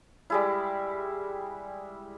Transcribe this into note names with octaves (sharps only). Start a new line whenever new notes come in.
G3 G#3 E4